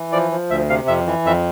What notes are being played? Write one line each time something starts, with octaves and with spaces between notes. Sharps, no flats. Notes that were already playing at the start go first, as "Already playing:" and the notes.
Already playing: E3
F3 D5
F3
D2 E5
C3 F5
F2 E5
E3
F2 E5